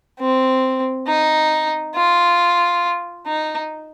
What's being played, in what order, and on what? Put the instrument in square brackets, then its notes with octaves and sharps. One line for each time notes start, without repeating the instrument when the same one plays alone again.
[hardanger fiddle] C4
D#4
F4
D#4